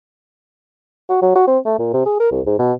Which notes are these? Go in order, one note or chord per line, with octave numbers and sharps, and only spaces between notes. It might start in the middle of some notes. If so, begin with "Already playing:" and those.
F#4
F#3
F#4
C4
A3
A#2
C3
G#4
A#4
C2
G#2
B2